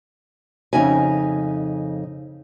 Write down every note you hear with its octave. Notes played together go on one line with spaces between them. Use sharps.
F2 C#3 D#4 D#5 E5 G#5